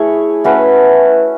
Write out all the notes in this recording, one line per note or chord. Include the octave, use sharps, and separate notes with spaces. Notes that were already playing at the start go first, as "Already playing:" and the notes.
Already playing: A3 E4 G#4 C#5
A3 C#4 F#4 B4